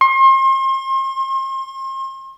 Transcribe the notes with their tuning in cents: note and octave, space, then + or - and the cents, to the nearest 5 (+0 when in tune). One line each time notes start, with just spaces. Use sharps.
C6 +40